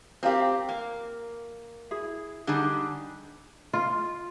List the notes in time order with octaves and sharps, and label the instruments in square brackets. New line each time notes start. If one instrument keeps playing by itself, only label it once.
[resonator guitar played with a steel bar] C4 G4 [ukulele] F4 A#4 F5
[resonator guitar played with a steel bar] A#3
[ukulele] E4 G#4
[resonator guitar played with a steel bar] D3 G3 [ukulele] D#4 G#4
[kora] F4